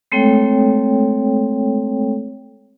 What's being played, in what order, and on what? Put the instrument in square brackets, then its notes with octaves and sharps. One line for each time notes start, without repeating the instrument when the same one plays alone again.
[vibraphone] G#3 A3 C4 A4 C#5 G5